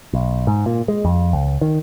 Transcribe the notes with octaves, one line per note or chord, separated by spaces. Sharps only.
B1
G#2
A#2
G#3
F2
C#2
D#3